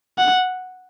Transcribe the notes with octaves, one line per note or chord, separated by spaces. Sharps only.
F#5